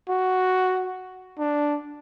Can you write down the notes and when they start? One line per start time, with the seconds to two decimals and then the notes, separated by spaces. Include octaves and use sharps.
0.08 F#4
1.38 D4